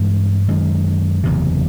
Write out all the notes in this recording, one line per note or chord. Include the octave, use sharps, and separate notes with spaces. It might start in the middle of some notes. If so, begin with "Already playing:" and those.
Already playing: G2 E3 G#3 C4
F#2 D#3 G#3
F#1 E2 C3